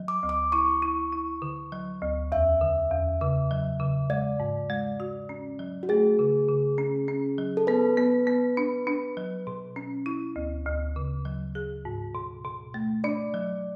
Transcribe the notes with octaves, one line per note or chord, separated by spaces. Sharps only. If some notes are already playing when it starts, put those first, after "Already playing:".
Already playing: F#3
D6
D2
D6
E4 C#6
E4
E4
D3
F#3
D2
E2 E5
D3
E2
C#3
F#3
C#3
G#3 D5
G#2
G#3
F#4
C#4
F#3
F#4
A3 G#4
C#3
C#3
C#4
C#4
F#3
A4
B3 B4
B3
B3
D4
D4
F#3
B2
C#4
E4
D2
D2
C#3
F#3
G#4
G#2
B2
B2
A3
D4 D5
F#3